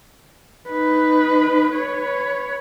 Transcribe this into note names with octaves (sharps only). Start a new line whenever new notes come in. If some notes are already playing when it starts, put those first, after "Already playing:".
D#4 B4
B4 C#5